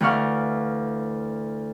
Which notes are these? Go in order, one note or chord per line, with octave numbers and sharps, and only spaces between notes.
D2 E3 F5 F#5 C#6 F6